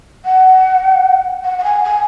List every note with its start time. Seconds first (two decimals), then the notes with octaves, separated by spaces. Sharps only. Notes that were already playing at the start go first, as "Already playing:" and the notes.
0.25 F#5
1.44 F#5
1.58 F#5
1.64 G#5
1.84 G#5